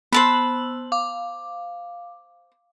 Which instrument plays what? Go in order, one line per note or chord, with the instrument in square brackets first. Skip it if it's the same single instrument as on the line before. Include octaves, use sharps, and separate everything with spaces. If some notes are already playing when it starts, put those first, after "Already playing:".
[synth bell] B3 E6 F#7 [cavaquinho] C5 A5 B5
[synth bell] F5 D6